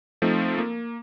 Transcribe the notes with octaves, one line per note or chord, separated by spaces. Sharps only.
F3 A3 C4 D#4
A#3